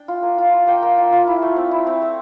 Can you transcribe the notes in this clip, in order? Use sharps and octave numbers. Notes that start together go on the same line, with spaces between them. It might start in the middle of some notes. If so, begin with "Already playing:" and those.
Already playing: D4 G5
F4
A#3
F4
F4
A#3 G5
A#3
F4
F4
E4
A3
C4
E4
C4
A3